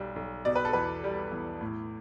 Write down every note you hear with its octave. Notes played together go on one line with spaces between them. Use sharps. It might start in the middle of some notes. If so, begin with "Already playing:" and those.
Already playing: B1 G3
B1
B2 D5
B4
A4
E2 B4
G3
E2
A2